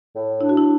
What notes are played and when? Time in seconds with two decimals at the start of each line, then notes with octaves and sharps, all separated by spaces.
0.15 A2
0.41 D4 E4
0.49 F#4
0.57 E4